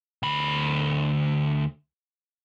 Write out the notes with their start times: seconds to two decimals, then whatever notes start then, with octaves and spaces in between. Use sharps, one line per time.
0.23 D2 B5